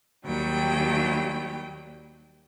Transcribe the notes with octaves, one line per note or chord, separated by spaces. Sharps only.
D#2 F#3 G3 G5